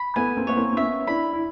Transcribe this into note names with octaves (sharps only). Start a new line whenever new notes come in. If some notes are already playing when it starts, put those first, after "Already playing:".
Already playing: B5
A3 B3 G#5
A#3 C4
B3 C#5
A#3 C4
C4
B3 C#4 E5
D4 E4 B5
E4